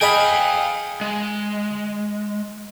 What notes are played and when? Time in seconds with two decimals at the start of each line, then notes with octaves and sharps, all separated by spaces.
0.01 G#4 D#5 F5 G5 B5
1.01 G#3